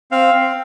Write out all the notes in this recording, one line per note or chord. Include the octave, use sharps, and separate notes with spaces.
C4 F5
C4